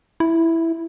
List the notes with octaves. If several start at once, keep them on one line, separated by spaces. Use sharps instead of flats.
E4